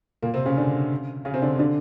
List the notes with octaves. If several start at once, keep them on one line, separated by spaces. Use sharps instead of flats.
A#2 A#3
C3 C4
C#3 C#4
D3 D4
C#3 C#4
C3 C4
D3 D4
D3 D4